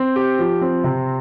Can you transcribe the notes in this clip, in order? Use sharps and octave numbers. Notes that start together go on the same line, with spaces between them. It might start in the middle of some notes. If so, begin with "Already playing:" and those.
Already playing: C4
G4
F3
C4
C3